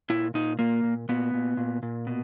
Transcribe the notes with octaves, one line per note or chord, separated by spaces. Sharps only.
A#2 E4
A#2 D#4
A#2 A#3
A#2
A#2 B3
A#2
A#2
A#2
B2